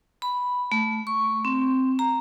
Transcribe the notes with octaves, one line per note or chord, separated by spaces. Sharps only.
B5
A3
C#6
C4
A#5